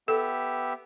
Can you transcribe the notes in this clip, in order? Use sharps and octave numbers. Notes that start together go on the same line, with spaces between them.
B3 G4 A4 E5